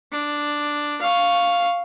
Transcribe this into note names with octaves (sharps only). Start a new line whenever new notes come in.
D4
F5 C#6